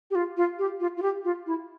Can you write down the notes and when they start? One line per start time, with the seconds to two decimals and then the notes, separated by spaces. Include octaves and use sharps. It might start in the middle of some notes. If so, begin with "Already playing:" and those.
0.11 G4
0.15 F4
0.37 F4
0.59 G4
0.80 F4
0.97 F4
1.02 G4
1.24 F4
1.46 E4